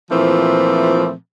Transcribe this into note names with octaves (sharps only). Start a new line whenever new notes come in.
A#2 E3 F3 A3 C4